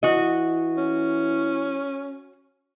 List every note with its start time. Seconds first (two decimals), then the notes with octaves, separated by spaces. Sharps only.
0.03 E3 F#4 D#5
0.77 C#4